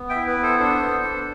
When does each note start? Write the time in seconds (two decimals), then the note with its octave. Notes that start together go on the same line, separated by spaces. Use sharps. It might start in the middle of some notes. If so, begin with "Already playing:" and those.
Already playing: B3
0.09 E5 G5
0.16 E4
0.27 B4
0.38 B3
0.43 A4 C5
0.59 D4 A4 C5
0.82 B3
1.03 D4